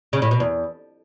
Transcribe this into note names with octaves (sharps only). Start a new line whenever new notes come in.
C#3
A2
B2
E2